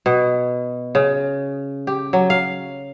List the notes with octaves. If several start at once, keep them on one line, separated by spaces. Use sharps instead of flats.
B2
C#3
G4
F#3
F5